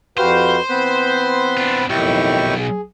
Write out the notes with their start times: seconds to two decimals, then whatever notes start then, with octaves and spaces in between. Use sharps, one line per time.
0.18 F2 F#4 G4 B4 C5 F5
0.69 E3 B3 C4 B4
1.57 D4 F4
1.90 B1 F2 A2 D#3 E4 G4 C#6
2.58 G#4